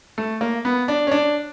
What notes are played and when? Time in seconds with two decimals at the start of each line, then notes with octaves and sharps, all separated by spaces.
0.18 A3
0.41 A#3
0.65 B3
0.88 D4
1.07 C#4
1.12 D4